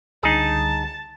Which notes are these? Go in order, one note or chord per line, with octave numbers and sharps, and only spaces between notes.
C#2 D3 G3 D#4 G#4 A5